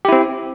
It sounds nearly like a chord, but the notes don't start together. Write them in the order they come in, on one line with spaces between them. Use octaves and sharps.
G4 E4 C4